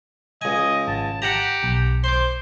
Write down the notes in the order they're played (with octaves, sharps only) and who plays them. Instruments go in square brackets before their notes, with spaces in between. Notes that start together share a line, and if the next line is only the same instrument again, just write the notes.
[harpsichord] C#2 G#5 [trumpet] D#5
[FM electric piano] G#1 [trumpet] A5
[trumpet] G4 [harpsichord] F#5 A5 A#5
[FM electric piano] B1
[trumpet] C5 [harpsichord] C6 D6